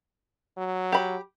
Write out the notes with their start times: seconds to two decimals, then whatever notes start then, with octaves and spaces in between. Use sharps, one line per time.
0.57 F#3
0.92 G4 B5